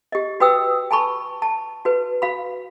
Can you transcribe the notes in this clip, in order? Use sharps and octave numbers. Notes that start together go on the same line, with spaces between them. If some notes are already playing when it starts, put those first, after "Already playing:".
G4 D#5
F#4 B4 G5 D#6 E6
G#5 A5 B5 C#6
A5
F#4 B4
F#4 F5 B5